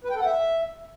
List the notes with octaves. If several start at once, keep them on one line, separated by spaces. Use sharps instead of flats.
B4
G5
A4
F#5
E5